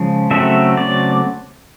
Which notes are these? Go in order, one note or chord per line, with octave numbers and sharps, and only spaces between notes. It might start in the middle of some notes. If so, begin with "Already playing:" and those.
Already playing: C#3 F3 G#3
C#3 F#3 A3 C4 E5
D5